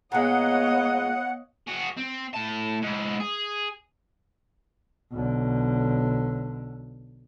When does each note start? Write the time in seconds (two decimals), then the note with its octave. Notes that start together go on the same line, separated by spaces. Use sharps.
0.12 A#2 G#3 B3 C#5 D#5 F5 F#5 D#6
1.67 F#4 G#4
1.97 C4
2.34 A2 A5
2.83 G#2 E4
3.20 G#4
5.12 B1 D3